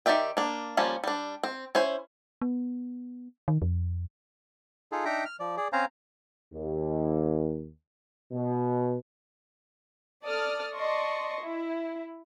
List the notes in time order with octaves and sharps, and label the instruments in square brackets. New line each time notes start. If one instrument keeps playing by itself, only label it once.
[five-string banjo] D#3 G4 D5 E5 G5
A#3 D4
F3 G3 A#3 C#4
G3 D4
C4
C#4 E4 C5
[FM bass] B3
D#3
F2
[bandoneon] D#4 F4 G#4 A4
D4 D#4 E5 G5 A#5
F6
F3 D5
G#4 D5
C4 C#4 C5 F5 G#5 A#5
[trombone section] D#2
B2
[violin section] A4 D5 D#6 F6
D5 D#5 A5 C6 C#6
E4